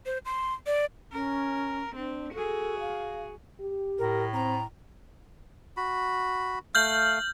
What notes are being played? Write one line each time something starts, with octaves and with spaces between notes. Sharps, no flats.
C5
C6
D5
C#4 A#4
C4 D4
F#4 G#4 A4
F5
G4
A2 A#4
C4 A#5
F#4 B5
A3 F5 F6 G6 F#7